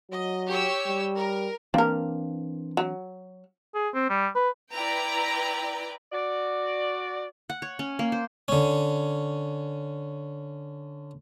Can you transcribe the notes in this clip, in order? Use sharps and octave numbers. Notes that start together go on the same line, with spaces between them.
F#3 D#5
G4 C#5 E6
G3
A#4
E3 A#3 C4 D4 A#4
F#3
G#4
C4
G3
B4
E4 B4 D5 G5 A#5
F#4 D5
F#5
C#5
C#4
A#3
C5
D3 C#4